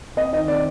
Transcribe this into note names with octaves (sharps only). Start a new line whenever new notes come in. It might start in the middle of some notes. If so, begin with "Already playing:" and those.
C4 D#5
D#3 D#5
C4 D5